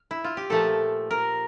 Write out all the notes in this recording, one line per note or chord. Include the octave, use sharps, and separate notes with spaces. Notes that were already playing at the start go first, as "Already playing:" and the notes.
Already playing: D4
E4
F4
G4
A#2 F3 A3 A4
A#4